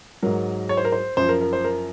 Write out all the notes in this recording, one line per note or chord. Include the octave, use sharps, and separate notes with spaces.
G#2 F#3 A#4
C#5
C5
A#4
C5
F#2 F3 C5
A#4
A#4
C5
A#4